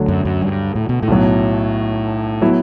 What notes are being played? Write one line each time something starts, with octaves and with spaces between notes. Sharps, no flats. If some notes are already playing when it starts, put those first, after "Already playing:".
Already playing: D2 D3 F#3
F#2
F#2
G2
A2
B2
A2
B1 B2 F#3
F#3 B3 E4